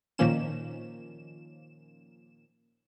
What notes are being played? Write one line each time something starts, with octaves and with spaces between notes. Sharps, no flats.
A#2 D#3 F3 A#3 C#4 E7